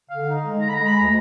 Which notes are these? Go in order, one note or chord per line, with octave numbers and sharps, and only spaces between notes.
D3 F5
D#4
G#3
D3 A#5
B5
G#3 A#5
B5
D2 A#5